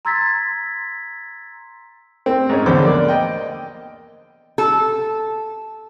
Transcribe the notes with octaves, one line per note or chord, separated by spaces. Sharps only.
A#5 C6 E6 G#6 A6 B6
C4
G#2 C#4
A#1 E2 D3 C5 D6 E6
A#3 D5
D#5 G5
A4